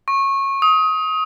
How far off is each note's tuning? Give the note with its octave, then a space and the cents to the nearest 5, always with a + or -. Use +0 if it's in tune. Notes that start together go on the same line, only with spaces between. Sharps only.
C#6 -20
D#6 +25